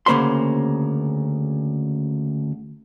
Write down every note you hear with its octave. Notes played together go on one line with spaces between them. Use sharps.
D2 C#3 A#3 C5 B5 C6